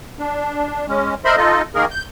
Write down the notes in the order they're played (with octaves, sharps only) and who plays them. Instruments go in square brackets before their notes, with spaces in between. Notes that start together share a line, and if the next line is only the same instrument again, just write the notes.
[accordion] D4
G#3 C#4
A#4 C5 D#5 E5 B5 C6
D#4 F4 A4 D#5
D#3 A#3 G#4 A#4
G6